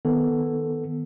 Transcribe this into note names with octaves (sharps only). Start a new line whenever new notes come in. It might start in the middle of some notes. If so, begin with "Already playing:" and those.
D#3 B3 A4